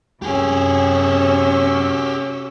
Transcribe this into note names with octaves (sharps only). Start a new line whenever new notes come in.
F#2 C3 C#4 G4 G#4 E6